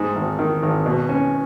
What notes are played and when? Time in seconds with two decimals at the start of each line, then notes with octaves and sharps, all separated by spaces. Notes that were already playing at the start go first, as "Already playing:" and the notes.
Already playing: G#2
0.15 G#1
0.39 D#3
0.63 G#1
0.86 B2
1.09 C#4